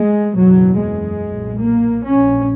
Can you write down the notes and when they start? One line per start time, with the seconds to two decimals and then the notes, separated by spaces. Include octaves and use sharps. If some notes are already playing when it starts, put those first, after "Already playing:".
Already playing: G#3
0.35 F#1 E2 B2 F#3
0.77 G#3
1.21 B1 A#2
1.63 A#3
2.06 A#1 A#2 C#4